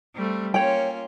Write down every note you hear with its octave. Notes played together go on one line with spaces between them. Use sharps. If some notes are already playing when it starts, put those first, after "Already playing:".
G3 A3 C4
A#3 C#4 F4 C#5 G5